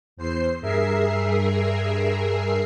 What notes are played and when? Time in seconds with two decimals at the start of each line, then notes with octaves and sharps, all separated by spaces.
0.17 E2 C5 C7
0.61 G2 G#4 A#4 E5 C7